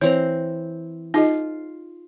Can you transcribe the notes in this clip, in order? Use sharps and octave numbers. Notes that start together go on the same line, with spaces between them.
E3 C4 C#5 A#5
D#4 F4 G#4 D#5